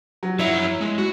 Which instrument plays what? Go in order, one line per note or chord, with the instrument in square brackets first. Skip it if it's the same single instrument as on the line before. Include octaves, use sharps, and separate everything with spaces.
[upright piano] F#3
[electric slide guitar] F#2 C#5 A#5 [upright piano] E4
[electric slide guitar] G#3
F#4